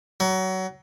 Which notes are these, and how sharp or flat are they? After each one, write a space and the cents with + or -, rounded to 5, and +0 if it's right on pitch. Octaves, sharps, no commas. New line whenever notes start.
F#3 +25